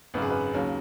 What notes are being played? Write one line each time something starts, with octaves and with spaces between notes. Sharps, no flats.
G#1 F#2 C#3 B4
G#4
B4
D#2 C#3 F#3